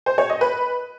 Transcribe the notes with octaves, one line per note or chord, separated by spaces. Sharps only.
C5
C#5
D#5
B4